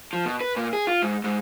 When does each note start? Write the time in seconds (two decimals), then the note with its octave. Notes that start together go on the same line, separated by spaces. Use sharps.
0.13 F3
0.26 B2
0.41 B4
0.56 A#2
0.73 G#4
0.87 F4
1.02 G#2
1.24 G#2